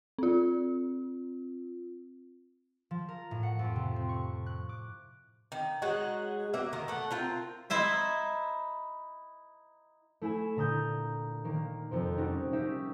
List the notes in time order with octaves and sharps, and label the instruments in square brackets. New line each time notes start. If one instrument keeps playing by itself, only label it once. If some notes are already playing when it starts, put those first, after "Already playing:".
[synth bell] C4 F4
[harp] F3
A#4
A2
F#5
F2
C3
C4
C#6
F#6
D6
[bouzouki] D#3
F#3 G#3 D#4 F#4
A#3 F#4 E5
D#3 A#4
A3 F#5
C4 F4 A#4
[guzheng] D#4 E4 C5 E5
[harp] A3 E4 G#5 E7
A#2 D3 A#5 D#6 G6
D#3 A#3
F2 C3 C4
G3 C#4 D#4 F#4
C#4 D#4 G4 E5